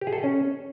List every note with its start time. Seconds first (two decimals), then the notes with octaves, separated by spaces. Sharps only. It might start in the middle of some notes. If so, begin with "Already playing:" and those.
0.01 G4
0.07 G#4
0.13 A4
0.18 G#4
0.24 C#4